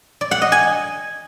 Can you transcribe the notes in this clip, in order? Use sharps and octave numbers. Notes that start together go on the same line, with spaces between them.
D5
F#5
D#5
G#5